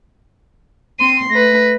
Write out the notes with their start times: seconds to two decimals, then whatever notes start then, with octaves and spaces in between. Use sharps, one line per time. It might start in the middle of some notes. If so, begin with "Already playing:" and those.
0.99 C4 C6 D#7
1.30 A3 B4 A#6